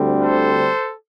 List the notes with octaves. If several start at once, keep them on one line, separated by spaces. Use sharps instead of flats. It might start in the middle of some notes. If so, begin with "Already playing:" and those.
Already playing: D2 D3 G3 C4
A4 C5